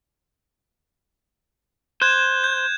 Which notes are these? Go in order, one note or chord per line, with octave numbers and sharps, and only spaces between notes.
C5 F#6 G#6 E7
G6